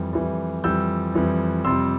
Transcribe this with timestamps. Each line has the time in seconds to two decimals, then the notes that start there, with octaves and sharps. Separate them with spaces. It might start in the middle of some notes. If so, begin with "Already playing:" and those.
Already playing: F2 E3 G3
0.13 F2 E3 G3
0.64 F2 E3 G3 E6 G6
1.14 F2 E3 G3
1.65 F2 C3 G3 C6 E6